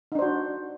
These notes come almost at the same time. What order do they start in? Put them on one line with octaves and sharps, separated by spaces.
D#4 D4 C5 F#4